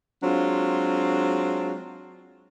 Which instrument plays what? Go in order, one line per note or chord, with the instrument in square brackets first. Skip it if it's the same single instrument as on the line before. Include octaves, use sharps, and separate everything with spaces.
[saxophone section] F#3 G#3 C4 D4 F4